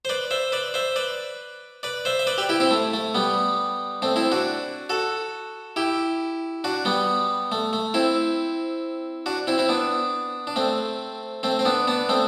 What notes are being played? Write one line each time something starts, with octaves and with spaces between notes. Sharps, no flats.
C5
B4 D5
C5 E5
B4 D5
C5 E5
B4 D5
B4 D5
C5 E5
E5
B4 D5
G4 B4
E4 G4
C4 E4
A3
A3
G3 B3
A3 C4
C4 E4
D4 F#4
F#4 A4
E4 G4
D4 F#4
G3 B3
A3
A3
C4 E4
D4 F#4
C4 E4
C4 E4
B3 D4
D4
A3 C4
A3 C4
C4
B3 D4
B3 D4
A3 C4